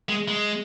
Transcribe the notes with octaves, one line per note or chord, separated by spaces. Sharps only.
G#3
G#3